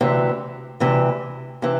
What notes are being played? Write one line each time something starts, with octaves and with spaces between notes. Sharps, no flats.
D2 C3 E3
D2 C3 E3
C3 E3